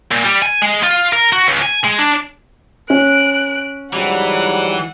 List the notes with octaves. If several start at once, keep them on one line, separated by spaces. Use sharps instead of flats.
A#2
G3
G#5
G#3
F4
A#4
F#4
C#2
G#5
G#3
D4
C#4 F#6 D7
G#2 E3 F#3 G3 F#5